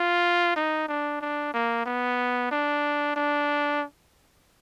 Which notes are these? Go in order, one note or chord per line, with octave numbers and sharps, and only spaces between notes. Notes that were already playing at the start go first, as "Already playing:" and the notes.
Already playing: F4
D#4
D4
D4
A#3
B3
D4
D4